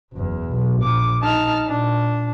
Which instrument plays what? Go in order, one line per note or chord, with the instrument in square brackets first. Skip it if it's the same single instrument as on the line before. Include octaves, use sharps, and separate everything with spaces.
[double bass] F#1 E2
B1
[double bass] A#1 [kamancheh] D6
[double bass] D#4 [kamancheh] A5 F6
[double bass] A#2 [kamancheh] D4